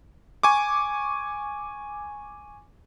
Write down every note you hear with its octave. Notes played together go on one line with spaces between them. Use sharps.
G#5 C#6 D6